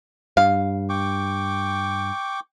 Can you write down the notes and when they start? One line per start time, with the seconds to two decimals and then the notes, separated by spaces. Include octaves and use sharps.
0.37 G2 F5
0.89 G5 C#6 D6